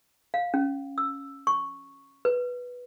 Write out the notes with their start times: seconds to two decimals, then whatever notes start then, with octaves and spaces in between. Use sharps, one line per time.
0.34 F5
0.54 C#4
0.98 E6
1.47 C#6
2.25 B4